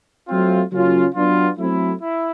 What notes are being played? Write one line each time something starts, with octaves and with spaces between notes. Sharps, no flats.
F#3 A3 C4 F4
C#3 F#3 A#3 C#4 F4
F#3 B3 D4 F4
F#3 A3 C4 E4
E4